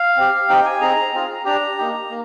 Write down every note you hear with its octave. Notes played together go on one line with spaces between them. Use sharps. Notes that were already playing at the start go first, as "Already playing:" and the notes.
Already playing: F5
C4 G4
C4 D#4 G4 G5
G#5
C4 D#4 G#4 A#5
C4 F4 G#4
D4 G4 A#5
A#3 D#4 G4
A#3